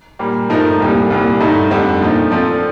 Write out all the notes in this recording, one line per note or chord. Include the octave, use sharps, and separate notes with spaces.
A#2 G3 A#3
G2 F3 A3 D#4 A#4
C2 A#2 G3
C2 A#2 G3
G2 D3 A3 D#4
F2 D3 G3
A#2 F3 A3 D#4
F3 C4 F4 A4 D5